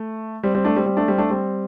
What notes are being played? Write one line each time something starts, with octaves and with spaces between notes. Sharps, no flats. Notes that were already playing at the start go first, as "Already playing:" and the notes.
Already playing: A3
G3 C4
G3 C4
A3 D4
G3 C4
G3 C4
A3 D4
G3 C4
A3 D4
G3 C4